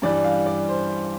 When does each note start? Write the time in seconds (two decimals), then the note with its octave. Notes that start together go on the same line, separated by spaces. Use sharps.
0.02 G2 E3 G3 D5
0.24 F5
0.46 D5
0.68 C5